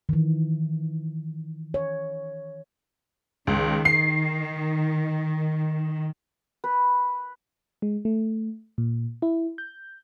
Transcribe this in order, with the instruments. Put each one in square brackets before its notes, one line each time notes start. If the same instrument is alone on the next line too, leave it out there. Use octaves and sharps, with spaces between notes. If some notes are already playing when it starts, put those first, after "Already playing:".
[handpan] D#3 E3
C#5
[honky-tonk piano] C#2 [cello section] D#3
[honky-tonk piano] C7
[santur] B4
[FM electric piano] G#3
A3
A#2
E4
G6